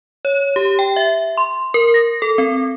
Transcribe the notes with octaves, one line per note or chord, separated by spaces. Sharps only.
C#5
G4
G5
E5
C6
A#4
A#6
A4
C4